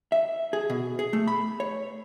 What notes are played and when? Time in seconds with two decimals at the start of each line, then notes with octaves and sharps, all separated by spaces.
0.12 E5
0.53 G#4
0.70 B2
0.99 G#4
1.13 A3
1.27 B5
1.60 C#5